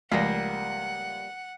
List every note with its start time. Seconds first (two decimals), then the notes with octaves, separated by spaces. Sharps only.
0.12 C#2 F3 G3 A3 A#3 D5 F#5